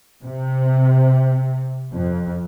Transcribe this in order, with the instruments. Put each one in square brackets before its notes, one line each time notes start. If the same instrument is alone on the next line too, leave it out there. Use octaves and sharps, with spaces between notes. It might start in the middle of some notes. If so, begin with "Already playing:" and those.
[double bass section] C3
F2